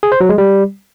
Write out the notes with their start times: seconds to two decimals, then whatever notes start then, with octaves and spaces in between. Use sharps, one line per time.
0.03 G#4
0.12 C5
0.21 F#3
0.29 G#3
0.38 G3